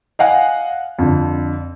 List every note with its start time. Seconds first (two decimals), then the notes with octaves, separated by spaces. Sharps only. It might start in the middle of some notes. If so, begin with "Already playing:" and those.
0.19 D#5 F5 F#5 G#5
0.99 F2 D3